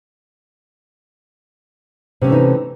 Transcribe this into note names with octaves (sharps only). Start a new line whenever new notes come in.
C3 E3 A3 C#4 D#4